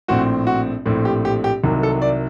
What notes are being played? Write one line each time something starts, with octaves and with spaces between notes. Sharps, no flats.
A#1 A2 A3 C4 F#4
F#4
A#1 A2 A3 C4
G4
G4
G4
C2 C3 D#3 F#3
A4
D5